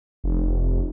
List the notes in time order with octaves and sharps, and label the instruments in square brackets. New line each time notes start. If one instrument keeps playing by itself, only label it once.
[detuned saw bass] F1